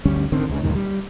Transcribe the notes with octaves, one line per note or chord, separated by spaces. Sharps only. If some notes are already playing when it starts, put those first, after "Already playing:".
G1 D2 G3 C#4
G#1 D3 D#3 C4
C#2 C#3
D2 G2 A#2 D#3
G3